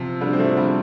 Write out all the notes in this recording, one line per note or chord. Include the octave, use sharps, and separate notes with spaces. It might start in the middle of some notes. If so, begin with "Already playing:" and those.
Already playing: C3 F3
D3 G3
C4
F3 A3
D3 G3